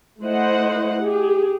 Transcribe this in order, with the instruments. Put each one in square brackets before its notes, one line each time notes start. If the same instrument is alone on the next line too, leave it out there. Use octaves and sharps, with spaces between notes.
[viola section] A3 E4 C5 D#5 F#5
G4 G#4